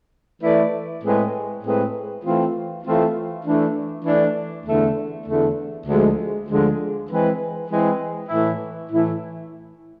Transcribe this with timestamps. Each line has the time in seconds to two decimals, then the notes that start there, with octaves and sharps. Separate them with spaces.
0.40 E3 A3 E4 B4 D5
1.02 A2 G#3 C4 G#4 B4
1.63 A2 G#3 C4 G#4 B4
2.23 E3 A3 C4 F4
2.83 E3 A3 C4 F4
3.44 E3 A3 D4
4.04 E3 A3 D4
4.65 E2 D3 A3
5.26 E2 D3 A3
5.86 D2 D3 F3 G#3
6.48 D2 D3 F3 G#3
7.09 E3 G#3 C4 E4 B4
7.68 E3 G#3 C4 E4 B4
8.29 A2 E3 A3 E4
8.90 A2 E3 A3 E4